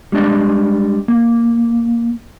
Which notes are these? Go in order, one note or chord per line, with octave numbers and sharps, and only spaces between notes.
G3 G#3 D4 D5 D#5
A#3